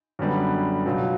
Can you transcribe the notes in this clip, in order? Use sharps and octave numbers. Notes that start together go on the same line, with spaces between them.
F#2 D3 G3 B3
C#2 B2 F#3